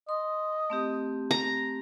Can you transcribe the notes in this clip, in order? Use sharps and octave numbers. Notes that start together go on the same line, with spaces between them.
D#5 C6
A3 C4 G4
A#5